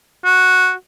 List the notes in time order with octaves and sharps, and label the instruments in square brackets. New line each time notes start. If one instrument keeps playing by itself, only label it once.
[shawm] F#4